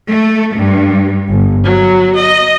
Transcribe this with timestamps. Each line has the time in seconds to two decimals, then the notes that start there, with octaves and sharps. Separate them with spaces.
0.10 A3
0.57 G2
1.31 G1
1.65 F#3
2.17 D#5